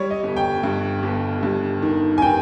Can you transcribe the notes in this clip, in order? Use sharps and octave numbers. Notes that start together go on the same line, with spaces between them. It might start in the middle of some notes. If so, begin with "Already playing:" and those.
Already playing: G3 C#5
D#5
G1
G5
G2
G1
G2
D#3
G#5
D#3 G5